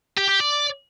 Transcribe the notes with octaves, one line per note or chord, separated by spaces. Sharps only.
G4
G4
D5